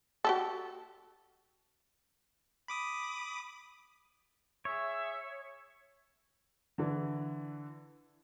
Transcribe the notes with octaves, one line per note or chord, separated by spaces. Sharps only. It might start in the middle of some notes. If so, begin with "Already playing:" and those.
F#4 G4 A4
B5 D6 D#6
G#4 C#5 E5
D3 E3